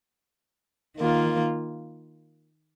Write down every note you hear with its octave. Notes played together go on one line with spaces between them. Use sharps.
D#3 A#3 F4